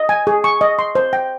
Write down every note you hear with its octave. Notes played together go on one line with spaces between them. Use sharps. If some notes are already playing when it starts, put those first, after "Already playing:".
Already playing: D#5
G#5
G#4
C#6
D#5
C6
C5
G5